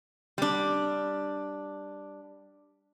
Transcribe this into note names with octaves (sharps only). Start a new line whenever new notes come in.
G3 D4